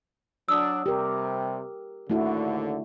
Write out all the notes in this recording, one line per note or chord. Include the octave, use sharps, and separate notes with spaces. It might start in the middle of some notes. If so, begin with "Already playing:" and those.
F#3 D4 D#6 E6
C3 G3 G4 A#4
D#2 D3 A3 E4 F#4